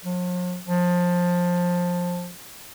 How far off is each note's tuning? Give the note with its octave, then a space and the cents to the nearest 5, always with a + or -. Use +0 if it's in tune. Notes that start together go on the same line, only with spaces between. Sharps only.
F3 +45
F3 +20